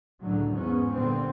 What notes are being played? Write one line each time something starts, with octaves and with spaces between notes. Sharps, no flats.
C#2 A2 D3 F#3
E2 G#2 B3 C#4
A#2 D3 G3 B3 C4